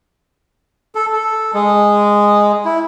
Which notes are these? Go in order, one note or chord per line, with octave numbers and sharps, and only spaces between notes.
A4
A4
G#3
E4